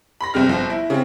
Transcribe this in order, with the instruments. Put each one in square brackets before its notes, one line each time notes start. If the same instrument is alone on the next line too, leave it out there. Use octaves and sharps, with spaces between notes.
[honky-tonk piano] B5 C6 A#6
G1 C3 G#3 C4 F6
G1 F3
E4
C#3 G#3 C4